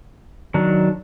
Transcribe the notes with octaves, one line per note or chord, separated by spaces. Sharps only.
D#3 F#3 D4